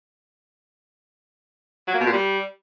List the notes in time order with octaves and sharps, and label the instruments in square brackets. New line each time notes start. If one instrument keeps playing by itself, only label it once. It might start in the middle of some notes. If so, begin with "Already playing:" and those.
[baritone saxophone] F#3
A#3
B2
A#2
G3